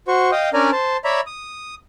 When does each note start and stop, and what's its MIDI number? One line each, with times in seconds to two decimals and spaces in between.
0.08 0.31 66
0.08 0.31 72
0.08 0.31 85
0.32 0.50 75
0.32 0.50 77
0.32 0.50 79
0.32 0.50 87
0.53 0.71 61
0.53 0.71 62
0.53 0.71 70
0.53 0.71 74
0.53 0.71 80
0.53 0.71 82
0.72 0.97 72
0.72 0.97 81
1.05 1.21 73
1.05 1.21 74
1.05 1.21 76
1.05 1.21 82
1.05 1.21 83
1.27 1.75 87